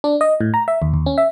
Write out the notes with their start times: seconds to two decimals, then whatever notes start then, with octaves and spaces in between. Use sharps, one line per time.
0.04 D4
0.21 D#5
0.41 A2
0.54 A#5
0.68 E5
0.82 D#2
0.94 D#2
1.06 C#4
1.18 E5